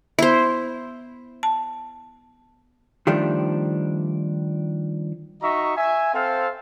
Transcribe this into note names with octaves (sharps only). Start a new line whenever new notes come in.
B3 E4 C5
A5
D#3 F3 G3 A3 D4
D#4 F#4 D#5 E5 A#5 C#6
E5 G#5
C4 A4 C5 F5